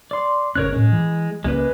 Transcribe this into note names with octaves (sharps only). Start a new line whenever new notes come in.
D5 C6
G1 C#3 C#4 A#4 C#5 F#6
A2 G#3 C#4
E3
C#2 G#3 A#3 C#4 B4